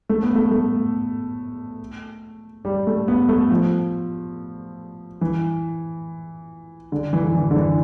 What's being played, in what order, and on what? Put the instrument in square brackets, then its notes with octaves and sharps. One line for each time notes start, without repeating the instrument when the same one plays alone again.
[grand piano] A3
B3
A3
A3
G3
A3
B3
A3
F3
E3
D3
E3
D3
E3
D3
E3